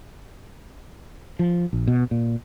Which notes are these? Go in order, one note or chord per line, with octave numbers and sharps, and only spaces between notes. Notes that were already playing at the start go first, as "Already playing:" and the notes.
F3
A#1
B2
A#2